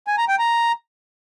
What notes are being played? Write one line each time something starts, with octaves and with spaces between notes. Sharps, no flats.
G#5
A#5
G5
A#5